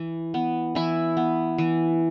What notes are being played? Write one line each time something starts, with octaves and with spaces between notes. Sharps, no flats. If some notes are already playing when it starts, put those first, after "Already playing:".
Already playing: E3
B3
E3 E4
B3
E3